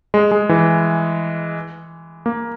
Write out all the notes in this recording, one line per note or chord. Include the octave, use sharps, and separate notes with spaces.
G#3
G#3
E3
A#3